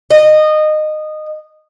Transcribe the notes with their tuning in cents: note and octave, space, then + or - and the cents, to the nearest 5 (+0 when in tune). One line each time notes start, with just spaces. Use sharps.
D#5 -20